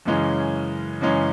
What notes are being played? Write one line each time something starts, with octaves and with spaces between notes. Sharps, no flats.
F#2 C#3 E3 G#3 C#4
F#2 C#3 E3 G#3 C#4